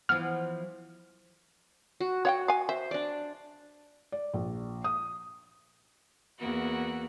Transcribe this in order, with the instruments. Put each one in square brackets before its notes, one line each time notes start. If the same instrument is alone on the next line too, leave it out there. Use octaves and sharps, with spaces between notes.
[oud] E3 F3 B3 [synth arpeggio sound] F6
[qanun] F#4
[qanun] F#4 [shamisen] C#5 F#5 G5
[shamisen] F5 G#5
[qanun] C5 [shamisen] E5
[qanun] D4 D5
[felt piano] D5
A#1
D#6
[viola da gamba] E2 A#3 F#4